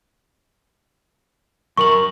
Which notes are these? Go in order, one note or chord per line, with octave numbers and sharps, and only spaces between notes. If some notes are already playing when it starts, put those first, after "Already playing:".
F#2 A#4 C#6 F#7